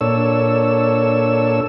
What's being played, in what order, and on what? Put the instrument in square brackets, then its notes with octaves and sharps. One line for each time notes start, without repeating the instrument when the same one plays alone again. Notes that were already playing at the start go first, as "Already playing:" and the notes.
[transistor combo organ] A#2 D4 A4 C#5 E6